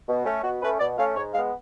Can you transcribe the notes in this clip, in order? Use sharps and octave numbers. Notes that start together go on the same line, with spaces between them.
B2
A3 C#4
B2 F#4
A3 C#4 B4
B2 D5
A3 C#4 F5
G#2 C#5
G#3 B3 F5